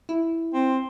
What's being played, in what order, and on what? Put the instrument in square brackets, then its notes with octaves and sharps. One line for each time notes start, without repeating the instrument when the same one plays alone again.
[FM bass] E4
[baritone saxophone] C4